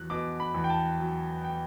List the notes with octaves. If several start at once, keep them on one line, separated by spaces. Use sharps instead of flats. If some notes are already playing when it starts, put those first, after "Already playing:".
Already playing: E2 F#3 F#6
B2 D6
B5
E2
G5
A5
F#3
G5